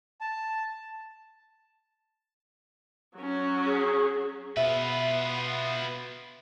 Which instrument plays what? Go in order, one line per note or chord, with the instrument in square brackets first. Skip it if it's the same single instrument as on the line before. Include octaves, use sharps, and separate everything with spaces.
[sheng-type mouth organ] A5
[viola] F#3 C#4
[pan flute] G#4
[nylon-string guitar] B2 [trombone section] B3 [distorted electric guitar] F4 B4 [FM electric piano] E5